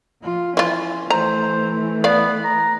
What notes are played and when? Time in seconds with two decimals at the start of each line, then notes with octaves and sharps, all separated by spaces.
0.22 F3 F4
0.57 E3 C#4 F4
1.10 E3 A3 C5 A#5
2.04 B3 D5 F5
2.44 A#5